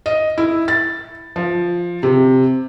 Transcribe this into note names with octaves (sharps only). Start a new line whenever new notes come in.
D#5
E4
A6
F3
C3